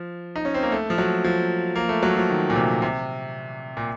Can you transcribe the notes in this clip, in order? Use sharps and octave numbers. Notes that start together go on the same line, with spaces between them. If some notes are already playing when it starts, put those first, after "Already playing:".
Already playing: F3
D#4
C#4
C4
A#3
A3
F3
F#3
F3
A#3
A3
F#3
F3
D#3
A#2
C3
C3
A#2